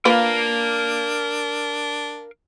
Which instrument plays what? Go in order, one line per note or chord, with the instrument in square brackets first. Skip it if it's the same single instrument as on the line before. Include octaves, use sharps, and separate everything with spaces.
[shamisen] A#3 F4 B4 [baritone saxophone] D4 [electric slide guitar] A#4 F5